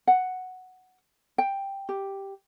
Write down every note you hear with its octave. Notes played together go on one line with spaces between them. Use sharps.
F#5
G5
G4